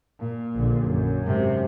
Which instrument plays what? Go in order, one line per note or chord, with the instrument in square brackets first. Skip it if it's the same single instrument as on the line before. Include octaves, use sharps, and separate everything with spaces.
[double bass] A#2
[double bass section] A#1 D3
F#2
[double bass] G#2 C3